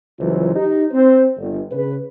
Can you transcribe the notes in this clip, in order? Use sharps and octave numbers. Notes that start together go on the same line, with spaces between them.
G1 C#2 E3 F#3 F4 C5
D#4 G4
C4 C5
G1
C#3 B4